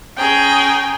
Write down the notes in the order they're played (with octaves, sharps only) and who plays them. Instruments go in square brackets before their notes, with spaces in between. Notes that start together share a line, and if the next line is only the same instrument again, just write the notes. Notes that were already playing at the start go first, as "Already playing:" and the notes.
[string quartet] C#4 G#4 A#5 [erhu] G5